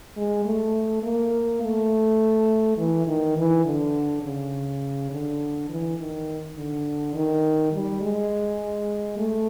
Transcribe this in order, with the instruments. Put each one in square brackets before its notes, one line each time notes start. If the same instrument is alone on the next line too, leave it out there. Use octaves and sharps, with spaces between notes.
[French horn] G#3
A3
A#3
A3
E3
D#3
E3
D3
C#3
D3
E3
D#3
D3
D#3
G3
G#3
A3